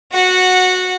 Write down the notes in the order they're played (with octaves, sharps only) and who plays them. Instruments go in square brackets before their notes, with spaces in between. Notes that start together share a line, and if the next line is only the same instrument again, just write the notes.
[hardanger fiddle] F#4 F#5